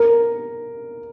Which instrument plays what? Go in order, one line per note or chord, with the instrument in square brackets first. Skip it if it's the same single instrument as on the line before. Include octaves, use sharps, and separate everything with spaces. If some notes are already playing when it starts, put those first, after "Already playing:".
Already playing: [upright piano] A#4